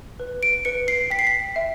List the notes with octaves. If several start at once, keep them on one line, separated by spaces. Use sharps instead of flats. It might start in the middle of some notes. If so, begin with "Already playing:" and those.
B4
D7
B4 C#7
C7
G5 B6
C7
B6
E5